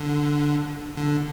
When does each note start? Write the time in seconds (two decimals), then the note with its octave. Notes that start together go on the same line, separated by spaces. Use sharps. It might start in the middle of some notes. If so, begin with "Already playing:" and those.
Already playing: D3
0.97 D3